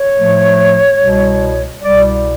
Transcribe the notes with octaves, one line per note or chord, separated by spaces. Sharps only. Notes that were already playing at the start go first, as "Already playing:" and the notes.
Already playing: C#5
A2 F3 A3
C2 B2 G3
C2 B2 G3 D5